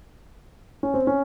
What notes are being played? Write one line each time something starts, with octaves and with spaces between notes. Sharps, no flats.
C#4
C4
C#4